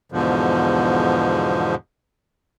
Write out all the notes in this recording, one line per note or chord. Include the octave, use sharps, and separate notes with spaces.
E2 G#2 B2 D3 F3